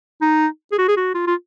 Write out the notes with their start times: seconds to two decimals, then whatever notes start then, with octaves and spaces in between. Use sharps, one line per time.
0.22 D#4
0.72 G#4
0.78 F#4
0.88 G#4
0.97 F#4
1.15 F4
1.27 F4